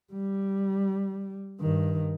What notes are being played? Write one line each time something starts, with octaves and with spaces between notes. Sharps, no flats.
G3
G2 D#3